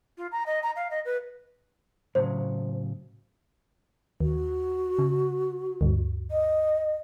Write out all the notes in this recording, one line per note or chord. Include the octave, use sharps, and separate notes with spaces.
F4
A#5
D#5
A#5
F5
D#5
B4
A2 C#3 F#3 C5
D#2 F#4
C#3
D2 G2
D#5